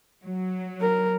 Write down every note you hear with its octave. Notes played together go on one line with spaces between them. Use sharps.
F#3
A#4